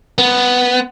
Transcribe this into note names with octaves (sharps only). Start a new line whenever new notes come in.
B3